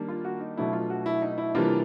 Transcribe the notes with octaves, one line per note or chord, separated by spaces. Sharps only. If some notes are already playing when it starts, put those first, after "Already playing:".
Already playing: D#3 G3 A#3 D4
F4
F#4
D#4
B2 F#3 A3 D4 E4
F4
F#4
E4
D#4
E4
C3 E3 G3 A#3 D4 F4